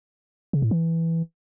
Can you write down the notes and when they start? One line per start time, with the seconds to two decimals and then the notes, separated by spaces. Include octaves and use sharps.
0.53 C#3
0.62 A2
0.71 E3